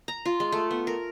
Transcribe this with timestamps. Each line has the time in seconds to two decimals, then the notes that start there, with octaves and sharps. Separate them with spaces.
0.08 A#5
0.25 F4
0.40 G#3
0.52 A3
0.71 B3
0.87 A#4